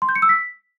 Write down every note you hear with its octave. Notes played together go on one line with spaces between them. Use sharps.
C6
G6
C#7
E6
B6